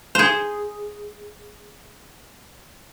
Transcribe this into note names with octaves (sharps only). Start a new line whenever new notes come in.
G#4 C5